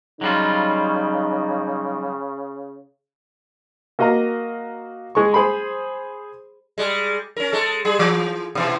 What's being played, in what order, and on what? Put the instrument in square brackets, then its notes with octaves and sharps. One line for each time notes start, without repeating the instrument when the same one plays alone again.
[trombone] C#3 [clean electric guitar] F#3 G3 F4 [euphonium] D#4
[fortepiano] A#3 F#4 D#5 F5 A#5
G#3 C#6
G#4 C5 B5 C6
[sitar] G3 G#3
C#4 A#4
G#3 A4
G3 G#4
E3
B2 E3